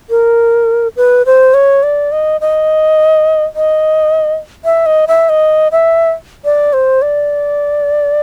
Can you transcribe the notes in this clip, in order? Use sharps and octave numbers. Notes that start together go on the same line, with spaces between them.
A#4
B4
C5
C#5
D5
D#5
D#5
D#5
E5
D#5
E5
D#5
E5
D5
C5
D5